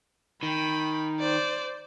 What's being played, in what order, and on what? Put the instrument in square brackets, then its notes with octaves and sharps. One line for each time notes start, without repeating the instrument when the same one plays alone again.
[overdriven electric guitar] D#3 [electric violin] G5 B5
[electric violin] C5 D5